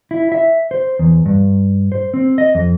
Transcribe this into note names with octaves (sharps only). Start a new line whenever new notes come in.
E4
E5
C5
E2
G2
C5
C4
D#5
F2